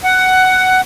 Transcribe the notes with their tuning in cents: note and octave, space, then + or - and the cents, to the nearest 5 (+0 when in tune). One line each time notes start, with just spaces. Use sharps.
F#5 +10